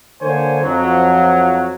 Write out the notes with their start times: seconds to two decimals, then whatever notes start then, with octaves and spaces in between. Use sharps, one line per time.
0.21 D3 A#3 C5 C#5 G#5
0.62 F2 F3 F#3